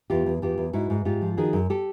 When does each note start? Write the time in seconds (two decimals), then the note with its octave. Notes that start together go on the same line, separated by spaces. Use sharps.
0.10 E2 F4 G4
0.26 E2
0.42 E2 F4 G4
0.58 E2
0.73 G#2 E4 F#4
0.90 G#2
1.05 G#2 F4 G4
1.22 F3
1.37 D#3 F#4 G#4
1.53 F#2
1.70 G4 A4